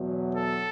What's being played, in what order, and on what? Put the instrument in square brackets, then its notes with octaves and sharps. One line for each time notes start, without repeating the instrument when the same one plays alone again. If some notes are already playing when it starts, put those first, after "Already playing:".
Already playing: [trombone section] E2 B2 F#3
[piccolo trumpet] A4